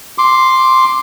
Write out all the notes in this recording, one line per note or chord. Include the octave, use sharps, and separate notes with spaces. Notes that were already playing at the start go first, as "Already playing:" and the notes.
C6 D6